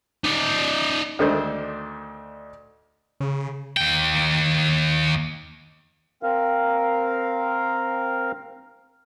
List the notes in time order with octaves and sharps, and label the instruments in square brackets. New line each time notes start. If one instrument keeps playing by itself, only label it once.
[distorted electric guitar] D#4 D5
[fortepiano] D2 D#3 A3 D4 D#4 C5
[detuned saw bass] C#3
[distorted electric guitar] D#2 G5
[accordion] C4 A#4 F5